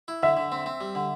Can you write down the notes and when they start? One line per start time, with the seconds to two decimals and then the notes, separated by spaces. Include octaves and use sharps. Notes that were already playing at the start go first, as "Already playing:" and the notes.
0.08 E4
0.23 D3 E5
0.37 D3
0.52 C4
0.66 C4
0.81 G3
0.95 D3